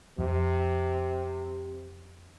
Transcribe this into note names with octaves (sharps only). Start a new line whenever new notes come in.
F2 C3